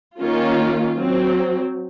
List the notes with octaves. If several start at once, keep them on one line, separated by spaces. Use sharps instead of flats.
D#3 A#3 C#4 F4
F#3 C4